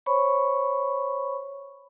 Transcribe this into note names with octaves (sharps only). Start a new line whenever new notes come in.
C5 C#5 B5 C#6